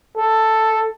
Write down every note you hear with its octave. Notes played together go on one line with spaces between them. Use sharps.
A4